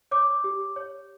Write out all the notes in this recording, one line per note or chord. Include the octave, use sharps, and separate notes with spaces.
C#5 D6
G4
C#5